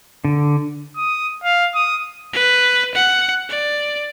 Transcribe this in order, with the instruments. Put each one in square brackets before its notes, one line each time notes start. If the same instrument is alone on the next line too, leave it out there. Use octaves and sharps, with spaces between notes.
[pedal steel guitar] D3
[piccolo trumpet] D#6
F5
D#6
[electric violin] B4
F#5
D5